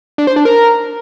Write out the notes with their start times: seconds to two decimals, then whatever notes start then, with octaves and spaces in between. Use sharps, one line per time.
0.18 D4
0.27 C5
0.36 D4
0.45 A#4